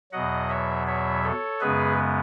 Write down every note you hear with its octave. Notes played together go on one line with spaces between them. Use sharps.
E2 B2 F#3 D#5 F#5
C#5 E5
C#5 E5
A4 C#5
F#2 C#3 G#3 B3 G#4 B4